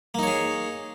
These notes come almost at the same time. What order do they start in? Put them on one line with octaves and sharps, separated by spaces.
A#3 D#4 C#5 G#4